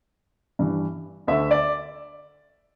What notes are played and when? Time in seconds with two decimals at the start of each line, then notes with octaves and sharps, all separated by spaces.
0.59 G2 E3
1.27 D2 D3 E5
1.51 D5